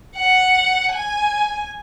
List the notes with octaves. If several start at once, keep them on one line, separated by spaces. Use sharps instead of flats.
F#5
G#5